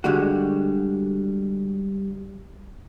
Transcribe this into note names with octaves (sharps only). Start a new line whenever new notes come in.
D3 G3 G#3 F#4